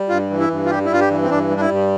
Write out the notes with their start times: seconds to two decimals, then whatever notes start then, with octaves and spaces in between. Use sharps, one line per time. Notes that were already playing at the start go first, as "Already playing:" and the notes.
Already playing: G3
0.09 G2 F4
0.30 E3
0.40 E4
0.50 G2
0.66 F4
0.70 G3 G4
0.85 E4
0.90 G2 F4
1.00 G4
1.10 E3
1.23 C4
1.30 G2 D4
1.51 G3
1.56 D4
1.61 E4
1.70 G2